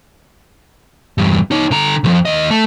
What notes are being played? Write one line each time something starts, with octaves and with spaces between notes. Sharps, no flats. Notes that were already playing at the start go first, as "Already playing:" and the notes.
E2 G2
D#4 C#5
D3 A#5
C2 F2
D#2 D#5
A3